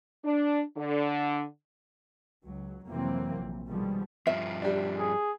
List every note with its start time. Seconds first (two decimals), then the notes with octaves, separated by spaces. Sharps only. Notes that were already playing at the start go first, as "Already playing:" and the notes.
0.25 D4
0.77 D3
2.43 C#2 F#3
2.86 F2 C3 E3 F#3 A#3 C4
3.36 A#1
3.68 B2 D#3 F3 G3 G#3
4.27 G2 F3 E5
4.62 G3 D4
4.98 G#4